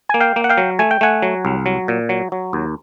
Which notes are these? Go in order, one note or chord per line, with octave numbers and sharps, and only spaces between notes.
A#3 G#5
F5 G5
A#3
F#5
F5 G5
F#3
A3 G#5
G5
A3 F#5 G#5
F#3
C2
F#3
A#2
F#3
F#3
D#2